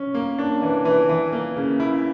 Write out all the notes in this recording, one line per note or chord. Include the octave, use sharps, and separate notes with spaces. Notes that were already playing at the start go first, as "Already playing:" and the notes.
Already playing: C#4
A#3
D4
E3
E3
E3
A#3
C#3
E4